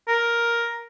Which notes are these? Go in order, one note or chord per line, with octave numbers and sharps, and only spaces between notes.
A#4